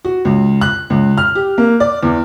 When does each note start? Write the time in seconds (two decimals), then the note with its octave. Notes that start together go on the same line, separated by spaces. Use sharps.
0.05 F#4
0.25 C#2
0.61 F#6
0.90 C#2
1.18 F6
1.35 G4
1.58 A#3
1.80 D5
2.03 E2